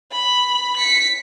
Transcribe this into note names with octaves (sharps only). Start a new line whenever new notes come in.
B5
B6 C#7